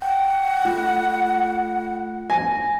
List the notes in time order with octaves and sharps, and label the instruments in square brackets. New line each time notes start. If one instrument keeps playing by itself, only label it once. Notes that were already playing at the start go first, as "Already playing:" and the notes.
[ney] F#5 [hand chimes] G5
[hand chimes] A3 F4 F#6
[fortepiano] G#5 [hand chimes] A#6